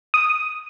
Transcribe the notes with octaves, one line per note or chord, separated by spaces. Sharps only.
D#6